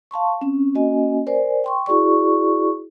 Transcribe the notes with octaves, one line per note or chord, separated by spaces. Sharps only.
F5 A5 C6 C#6
C4 C#4
A#3 C#4 F#4 D#5 G#5
A#4 C5 D5 G#5
G5 C6 C#6
E4 F#4 G#4 D5 C#6